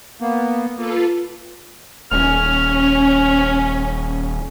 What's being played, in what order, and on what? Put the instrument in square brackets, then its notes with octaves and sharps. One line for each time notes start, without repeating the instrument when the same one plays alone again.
[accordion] A#3 B3
[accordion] A#3 [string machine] F4 A4 B4
[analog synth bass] D#1 [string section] C#4 [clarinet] F6